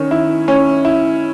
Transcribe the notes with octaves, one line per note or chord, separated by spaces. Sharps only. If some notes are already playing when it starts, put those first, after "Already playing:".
Already playing: D#3 C#4
E4
C#4
E4